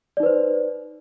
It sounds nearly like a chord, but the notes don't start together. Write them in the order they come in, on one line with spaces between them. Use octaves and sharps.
D5 D#4 B4 C5